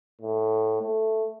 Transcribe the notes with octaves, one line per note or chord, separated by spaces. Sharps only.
A2
A3